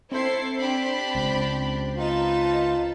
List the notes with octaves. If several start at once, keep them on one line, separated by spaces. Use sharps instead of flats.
C4 E4 A4 C5 C7
D4 G4 B5
C#2
D#4 F4 B4 A5